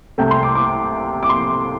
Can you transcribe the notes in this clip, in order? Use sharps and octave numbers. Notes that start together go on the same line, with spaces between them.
C2 C3 A3 G5
C6
D6
D6
D6
C6